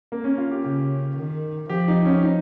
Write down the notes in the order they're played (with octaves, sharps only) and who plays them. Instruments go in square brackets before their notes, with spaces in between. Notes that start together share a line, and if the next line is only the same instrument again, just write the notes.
[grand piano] A#3
C#4
F4
G4
[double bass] C#3 [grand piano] G4
[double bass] D#3
[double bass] F3 [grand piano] G4
[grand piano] D#4
C#4
D#4